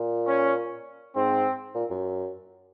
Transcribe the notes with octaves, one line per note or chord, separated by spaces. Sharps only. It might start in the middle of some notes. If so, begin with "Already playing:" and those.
Already playing: A#2
C#4
G#2 C4
A#2
F#2